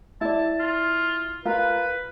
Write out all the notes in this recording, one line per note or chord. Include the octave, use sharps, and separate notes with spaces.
E4 D5 A5
F4
F4 A#4 B4